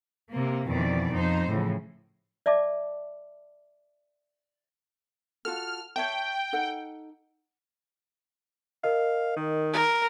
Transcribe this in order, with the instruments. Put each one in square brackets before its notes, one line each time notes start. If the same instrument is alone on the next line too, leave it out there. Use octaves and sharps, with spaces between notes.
[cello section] C3 A#3
F2 B2 D#3 E3 D5
F2 D#4 C5
A2 C#3 E3 F3
[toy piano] D5 E5 A5 D6
[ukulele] F4 F#4 A4 [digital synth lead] F6
[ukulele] C#5 E5 A5 [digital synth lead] G5
[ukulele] D#4 A4 F#5
[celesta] A#4 D#5 [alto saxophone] F5
[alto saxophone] D#3
[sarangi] A#4